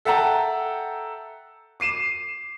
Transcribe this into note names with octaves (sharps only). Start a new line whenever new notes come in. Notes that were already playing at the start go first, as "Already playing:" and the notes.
A4 E5 F#5 G5 A5 A#5
D6 C7 D#7 E7